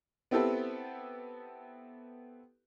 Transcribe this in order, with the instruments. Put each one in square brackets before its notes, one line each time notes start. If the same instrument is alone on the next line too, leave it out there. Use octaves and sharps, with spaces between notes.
[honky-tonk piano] B3 C4 E4 G4 A4 B4